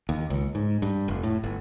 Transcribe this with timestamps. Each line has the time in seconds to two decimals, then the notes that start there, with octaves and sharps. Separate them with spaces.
0.09 D#2
0.30 C#2
0.55 G#2
0.82 G2
1.08 F1
1.23 A2
1.43 G1